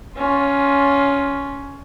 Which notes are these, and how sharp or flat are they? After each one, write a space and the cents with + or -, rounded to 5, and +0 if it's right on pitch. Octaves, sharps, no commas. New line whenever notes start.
C#4 +10 F4 +10